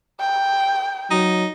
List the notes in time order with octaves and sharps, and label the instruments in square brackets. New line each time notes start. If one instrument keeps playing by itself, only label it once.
[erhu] G5
[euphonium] F#3 [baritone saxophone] D#4